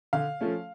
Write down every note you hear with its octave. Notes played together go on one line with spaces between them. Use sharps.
D3 F5
F3 A3 C#4